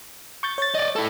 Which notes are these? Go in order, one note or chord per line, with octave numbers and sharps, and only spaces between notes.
C#6 G6 A6
C#5 A6
D5 D#5
E4 A4